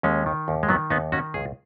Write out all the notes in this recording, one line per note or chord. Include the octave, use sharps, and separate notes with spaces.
D#2 G#3 C#4
D#3
D#2
G#3
D#3 F#3 B3
D#2 B3 D#4
D#3 C#4 F#4
C#2 G#4